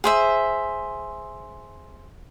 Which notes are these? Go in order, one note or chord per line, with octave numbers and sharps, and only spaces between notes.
G#4 C5 E5